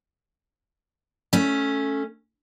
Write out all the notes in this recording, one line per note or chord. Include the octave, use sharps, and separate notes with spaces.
A3 C#4